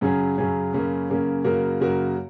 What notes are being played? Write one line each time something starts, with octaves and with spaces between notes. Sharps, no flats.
F#2 C#3 F#3 C#4 G#4
F#2 C#3 F#3 C#4 G#4
F#2 C#3 A#3 C#4
F#2 C#3 A#3 C#4
F#2 C#3 A#3 F#4 A#4
F#2 C#3 A#3 F#4 A#4